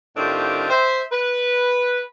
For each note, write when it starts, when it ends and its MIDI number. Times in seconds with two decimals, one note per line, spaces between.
0.17 0.66 45
0.17 0.66 51
0.17 0.66 60
0.17 0.66 62
0.17 0.66 65
0.17 0.66 67
0.70 1.02 72
0.70 1.02 76
1.12 2.01 71